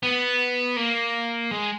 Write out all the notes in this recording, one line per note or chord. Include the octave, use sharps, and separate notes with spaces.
B3
A#3
G#3